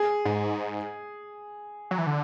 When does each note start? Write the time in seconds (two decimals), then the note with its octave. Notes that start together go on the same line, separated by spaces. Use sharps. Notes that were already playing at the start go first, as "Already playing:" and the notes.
Already playing: G#4
0.25 G#2
1.91 F#3
1.98 E3
2.06 D3